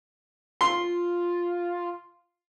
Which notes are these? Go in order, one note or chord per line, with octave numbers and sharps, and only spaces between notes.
F4 C6